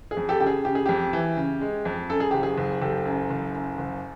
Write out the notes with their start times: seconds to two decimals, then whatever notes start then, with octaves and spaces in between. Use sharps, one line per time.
0.11 G#4
0.17 F2
0.29 G4 A4
0.40 C#3 G4
0.47 G#4
0.65 C#3 G4
0.75 G#4
0.86 F2 G4
1.13 E3
1.37 C#3
1.61 G#3
1.85 F2
2.09 F#2 A4
2.20 G#4
2.31 F#1 G4
2.43 G#4
2.58 F#1
2.81 F#1 G4 A4
3.05 F#2
3.30 F#1
3.54 F#2
3.78 F#1